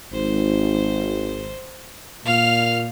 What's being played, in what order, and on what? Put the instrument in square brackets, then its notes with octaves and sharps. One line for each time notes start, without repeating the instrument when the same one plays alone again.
[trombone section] G#1 [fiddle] C5
[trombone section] A#2 [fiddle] F5 F6